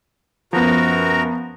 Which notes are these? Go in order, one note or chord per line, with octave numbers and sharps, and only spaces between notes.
F#2 F3 B3 F#4 A#4 A#5